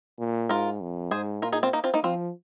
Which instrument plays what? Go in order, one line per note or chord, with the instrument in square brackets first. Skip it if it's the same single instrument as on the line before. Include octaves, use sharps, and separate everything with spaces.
[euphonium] A#2
[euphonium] G#2 [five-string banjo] F4 A#4
[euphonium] F2
[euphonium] G#2 [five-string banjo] G#4 C5
[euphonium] A#2 [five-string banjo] F4 A#4
[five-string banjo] D#4 G#4
C4 F4
A#3 D#4
C4 F4
A#3 D#4
[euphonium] F3 [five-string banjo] C4 F4